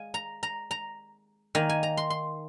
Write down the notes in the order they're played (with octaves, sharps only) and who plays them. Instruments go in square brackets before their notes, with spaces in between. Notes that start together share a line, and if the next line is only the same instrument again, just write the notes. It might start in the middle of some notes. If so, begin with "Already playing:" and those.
Already playing: [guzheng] G#3 F5 G#5
A#5
A#5
A#5
D#3 A#3 G#5
G#5
A#5
C6
C6